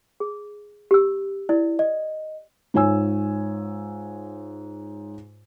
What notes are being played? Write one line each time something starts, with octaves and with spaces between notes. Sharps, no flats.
G#4
G4 E6
E4 D5
D#5
G#2 F4 C#5 G#5 E6